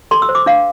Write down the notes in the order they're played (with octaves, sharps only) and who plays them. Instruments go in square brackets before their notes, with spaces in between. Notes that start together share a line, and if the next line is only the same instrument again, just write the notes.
[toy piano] A4 C6
E6
C5
D6
D4 F5